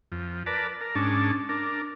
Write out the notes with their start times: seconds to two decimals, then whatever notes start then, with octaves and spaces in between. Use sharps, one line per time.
0.12 F2
0.46 A#4 B4 D5 A5
0.81 A#4
0.95 G#2 C#4 D4 A5
1.49 D4 A#4